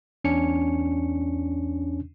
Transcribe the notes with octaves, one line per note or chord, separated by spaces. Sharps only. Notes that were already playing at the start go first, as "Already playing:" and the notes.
E2 C#4 D4 C#7